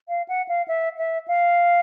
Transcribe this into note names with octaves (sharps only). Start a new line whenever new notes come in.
F5
F#5
F5
E5
E5
F5